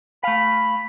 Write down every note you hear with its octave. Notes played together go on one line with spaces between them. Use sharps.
A3 F5 B5